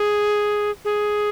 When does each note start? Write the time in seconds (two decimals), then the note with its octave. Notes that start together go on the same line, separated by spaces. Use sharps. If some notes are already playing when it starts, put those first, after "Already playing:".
Already playing: G#4
0.85 G#4